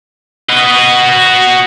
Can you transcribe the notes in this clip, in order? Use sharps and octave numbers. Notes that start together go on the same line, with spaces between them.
F#4 D#5